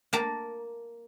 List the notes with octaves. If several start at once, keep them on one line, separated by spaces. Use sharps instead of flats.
A#3 A5 A#5